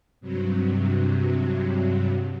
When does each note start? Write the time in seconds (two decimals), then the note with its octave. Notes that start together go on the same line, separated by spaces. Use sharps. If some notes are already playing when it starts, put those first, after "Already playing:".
0.20 G2 C3 F#3